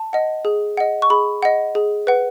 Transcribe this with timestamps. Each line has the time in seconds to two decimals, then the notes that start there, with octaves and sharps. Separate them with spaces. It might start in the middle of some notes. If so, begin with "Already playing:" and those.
Already playing: A5
0.13 D#5 F#5
0.45 G#4
0.77 D#5 F#5
1.02 C#6
1.10 G#4 B5
1.43 D#5 F#5
1.75 G#4
2.07 B4 F#5